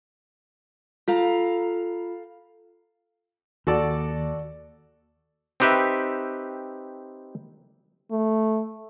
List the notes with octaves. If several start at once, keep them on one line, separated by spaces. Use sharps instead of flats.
F4 A4 F5 A#5
D#2 F#4 A4 D5
C4 D#4 G4 B4 E5
A3